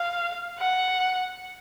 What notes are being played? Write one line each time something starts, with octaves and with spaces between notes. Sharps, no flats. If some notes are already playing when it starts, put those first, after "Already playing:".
Already playing: F5
F#5